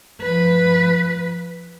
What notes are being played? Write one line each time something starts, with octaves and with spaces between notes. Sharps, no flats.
F3 B4